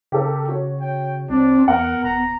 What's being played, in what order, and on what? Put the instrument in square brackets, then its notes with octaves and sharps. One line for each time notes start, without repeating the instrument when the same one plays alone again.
[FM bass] C#3 [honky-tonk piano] G4 A4 A#4
[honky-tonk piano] F#4 C#5
[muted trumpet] G5
[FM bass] C2 [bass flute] C4 [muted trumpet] D4
[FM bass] E2 [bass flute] B3 [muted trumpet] A#4 [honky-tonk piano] F#5
[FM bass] D#1 [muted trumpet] A#5